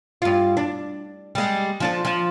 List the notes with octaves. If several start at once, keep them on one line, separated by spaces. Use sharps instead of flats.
G2 F4
D4
G3 G#3
F3 D4 A4
F3